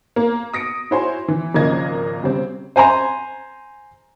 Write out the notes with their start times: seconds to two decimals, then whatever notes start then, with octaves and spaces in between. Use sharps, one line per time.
0.16 A#3
0.53 D#6 A#6 C#7 D7
0.91 E4 F#4 C5 C#5 G#5 C6
1.28 E3
1.54 G#1 C#3 F3 A#3 D#5 G#6
2.23 C#3 G3 C4
2.76 C5 G#5 A#5 C6